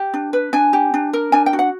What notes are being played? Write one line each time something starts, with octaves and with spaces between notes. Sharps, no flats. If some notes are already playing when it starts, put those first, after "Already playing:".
Already playing: G4
D4
B4
D4 G#5
G4
D4
A#4
D4 G#5
G5
F#4
F#5